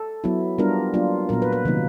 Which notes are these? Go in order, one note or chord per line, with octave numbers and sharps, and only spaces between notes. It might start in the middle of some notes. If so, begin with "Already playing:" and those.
Already playing: A4
F#3 B3 E4
G3 B3 D4 F4 A#4
F#3 A#3 D4 F4
A#2 F#3 B3 A#4
B4
B4
C3 D#3 F#3 A#3 D#4